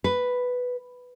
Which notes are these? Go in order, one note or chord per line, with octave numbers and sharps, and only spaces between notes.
B4